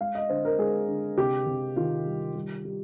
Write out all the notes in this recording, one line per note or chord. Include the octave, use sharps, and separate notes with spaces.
G#3 F5
D#5
D3 C5
A#4
G#3 G#4
D3
C3 G4
C3
D#3 F4
G3
G3
G3